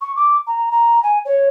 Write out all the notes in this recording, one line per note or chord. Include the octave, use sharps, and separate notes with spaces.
C#6
D6
A#5
A#5
G#5
C#5